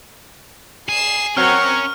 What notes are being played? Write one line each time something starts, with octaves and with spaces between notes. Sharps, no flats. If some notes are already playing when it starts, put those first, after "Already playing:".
G#4 C7 E7
F#3 C4 C#4 A#4 C#6 F6